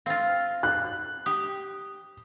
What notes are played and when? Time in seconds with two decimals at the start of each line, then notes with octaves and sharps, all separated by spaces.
0.06 C4 F4 F5
0.63 F#6
1.26 G4 D#6